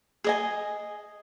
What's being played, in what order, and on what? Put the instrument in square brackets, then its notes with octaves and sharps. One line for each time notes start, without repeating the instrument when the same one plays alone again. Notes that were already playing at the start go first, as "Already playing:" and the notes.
[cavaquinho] G#4 D#5 G#5